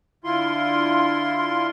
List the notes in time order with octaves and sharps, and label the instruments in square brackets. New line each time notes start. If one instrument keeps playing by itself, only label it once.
[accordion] D3 E4 F4 C6